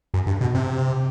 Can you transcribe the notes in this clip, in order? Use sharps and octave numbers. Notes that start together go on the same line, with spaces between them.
F#2
G2
B2
C3